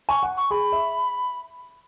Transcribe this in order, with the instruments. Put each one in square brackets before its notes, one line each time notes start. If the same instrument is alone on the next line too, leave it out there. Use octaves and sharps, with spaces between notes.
[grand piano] G#5 [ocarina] C#6
[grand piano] F#5
[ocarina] C#6
[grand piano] G#4 [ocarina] B5
[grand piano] E5